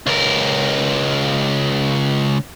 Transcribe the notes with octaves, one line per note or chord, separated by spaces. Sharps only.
C#2 A#4